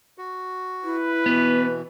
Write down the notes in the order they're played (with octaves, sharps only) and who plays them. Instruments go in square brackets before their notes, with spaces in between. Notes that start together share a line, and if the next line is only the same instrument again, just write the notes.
[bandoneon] F#4
[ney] E4 [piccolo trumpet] B4
[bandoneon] B2 E3 [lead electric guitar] B3